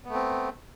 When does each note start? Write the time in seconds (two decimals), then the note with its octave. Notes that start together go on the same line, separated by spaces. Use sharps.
0.05 B3
0.09 A3
0.14 C4